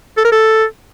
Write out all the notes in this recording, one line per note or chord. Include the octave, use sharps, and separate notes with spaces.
A4
A#4
A4